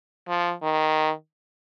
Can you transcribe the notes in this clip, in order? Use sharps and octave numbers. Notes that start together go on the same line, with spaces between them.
F3
D#3